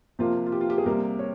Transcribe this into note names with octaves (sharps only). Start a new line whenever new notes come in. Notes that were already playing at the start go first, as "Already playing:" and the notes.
C3 F3 A#3 F4
F4
G4
F4
G4
G#4
C3 G3 A#3 A#4
C#5